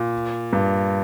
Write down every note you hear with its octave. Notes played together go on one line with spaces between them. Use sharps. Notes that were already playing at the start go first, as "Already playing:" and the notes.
Already playing: A#2
G2